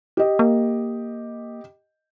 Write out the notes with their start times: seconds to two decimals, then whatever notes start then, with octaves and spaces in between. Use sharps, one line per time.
0.17 G4 D#5
0.39 A#3